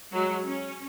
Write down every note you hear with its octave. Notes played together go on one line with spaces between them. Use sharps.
F#3 G#3
C#4